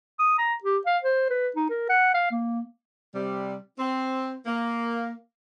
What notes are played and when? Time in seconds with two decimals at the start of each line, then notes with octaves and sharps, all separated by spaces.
0.19 D#6
0.39 A#5
0.64 G4
0.86 F5
1.03 C5
1.30 B4
1.56 D#4
1.70 A#4
1.90 F#5
2.14 F5
2.32 A#3
3.15 C3 G3
3.79 C4
4.46 A#3